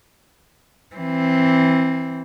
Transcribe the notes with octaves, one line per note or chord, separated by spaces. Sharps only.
E3 C4